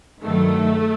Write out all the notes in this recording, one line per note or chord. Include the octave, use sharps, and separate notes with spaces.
G2 D#3 F#3 A3